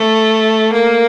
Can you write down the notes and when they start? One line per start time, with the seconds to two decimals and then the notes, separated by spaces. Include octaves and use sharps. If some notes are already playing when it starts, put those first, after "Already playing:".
Already playing: A3
0.73 A#3